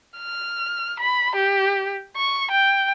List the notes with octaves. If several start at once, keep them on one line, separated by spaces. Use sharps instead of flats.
F6
B5
G4
C#6
G5